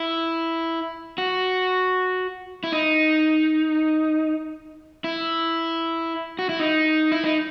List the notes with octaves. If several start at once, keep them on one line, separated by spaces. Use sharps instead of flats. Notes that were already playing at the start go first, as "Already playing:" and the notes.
Already playing: E4
F#4
E4
D#4
E4
F#4
E4
D#4
E4
D#4